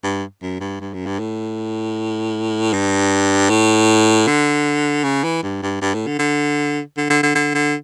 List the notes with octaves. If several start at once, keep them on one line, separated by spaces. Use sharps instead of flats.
G2
F#2
G2
G2
F#2
G2
A2
G2
A2
D3
C#3
E3
G2
G2
G2
A2
D3
D3
D3
D3
D3
D3
D3